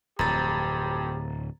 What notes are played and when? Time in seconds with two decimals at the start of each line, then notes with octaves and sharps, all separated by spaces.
0.19 D1 F2 G4 A#5 A6